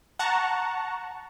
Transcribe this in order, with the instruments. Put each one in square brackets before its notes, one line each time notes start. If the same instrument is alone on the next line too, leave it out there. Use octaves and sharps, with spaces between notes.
[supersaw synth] F#5 A5 A#5 C#6